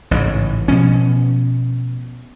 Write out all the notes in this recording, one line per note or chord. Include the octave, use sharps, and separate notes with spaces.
A1 G#2 C#3
B2 F3 C#4